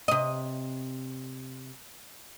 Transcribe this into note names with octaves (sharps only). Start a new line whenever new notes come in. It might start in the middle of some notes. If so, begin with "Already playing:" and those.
C3 D#5